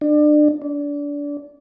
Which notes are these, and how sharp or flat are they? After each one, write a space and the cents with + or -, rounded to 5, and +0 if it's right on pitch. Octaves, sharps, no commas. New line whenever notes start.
D4 +30
D4 -25